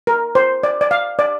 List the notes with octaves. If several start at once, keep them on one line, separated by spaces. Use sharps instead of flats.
A#4
C5
D5
D5
F5
D5